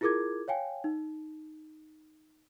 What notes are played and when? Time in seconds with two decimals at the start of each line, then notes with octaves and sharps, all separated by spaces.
0.01 E4 F4 G#4 A#4 D6 G#6
0.48 C#5 F5 G5 G#5
0.84 D#4